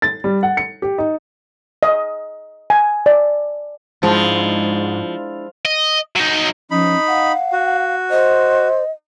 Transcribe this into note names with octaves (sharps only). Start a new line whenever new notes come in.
A6
G3
F#5
C#7
G4
D#4
D#5
G#5
D5
G#2 F3 G#3 D4 E4
D#5
F#3 D#4
F3 C#4 D#4 B5
F5 F#5
F#4
C5 D#5